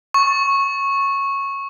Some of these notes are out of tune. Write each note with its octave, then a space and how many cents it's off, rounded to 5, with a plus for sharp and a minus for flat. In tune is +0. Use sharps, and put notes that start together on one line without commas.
C#6 -10